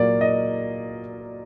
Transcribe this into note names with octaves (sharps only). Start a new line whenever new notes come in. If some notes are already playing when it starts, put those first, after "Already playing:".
Already playing: A#2 F#3 A#3 D5
D#5